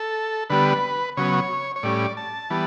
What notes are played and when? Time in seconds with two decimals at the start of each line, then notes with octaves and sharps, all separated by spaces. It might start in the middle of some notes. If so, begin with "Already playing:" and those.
Already playing: A4
0.50 D3 G3 B3 B4
1.17 C#3 F#3 B3 C#5
1.76 C#5
1.83 A2 G3 C#4 D5
2.17 A5
2.50 E3 G3 B3